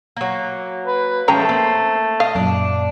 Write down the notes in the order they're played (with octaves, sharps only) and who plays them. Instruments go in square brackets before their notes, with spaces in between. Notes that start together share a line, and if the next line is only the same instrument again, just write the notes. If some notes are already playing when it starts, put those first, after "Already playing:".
[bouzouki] F#3 A#3
[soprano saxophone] B4
[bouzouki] F3 G#3 [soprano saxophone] A3 [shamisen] C#4 G5 A#5
[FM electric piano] A#3 [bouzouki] C4
[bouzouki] D#5 [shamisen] F5
[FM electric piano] F#2 A#2 [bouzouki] D4